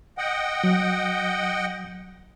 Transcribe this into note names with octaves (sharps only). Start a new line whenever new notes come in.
D#5 F#5 G5
F#3